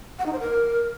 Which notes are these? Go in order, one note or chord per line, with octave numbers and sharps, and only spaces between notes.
F#5
D#4
C5
A#4